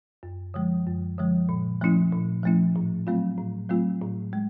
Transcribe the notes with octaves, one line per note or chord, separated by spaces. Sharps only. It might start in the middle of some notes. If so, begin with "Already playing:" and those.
F#2
D3 F3 G#3
F#2
D3 F3 G#3
A#2
F3 A3 C#4 E4
A#2
F3 A3 C#4 E4
A2
F#3 A3 C4 F4
A2
F#3 A3 C4 F4
A2
G#3